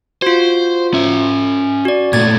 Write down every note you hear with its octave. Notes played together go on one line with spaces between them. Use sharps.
F4 F#4 C5
C#4 E5
F#4 D5
A#2 A3 G#6 A6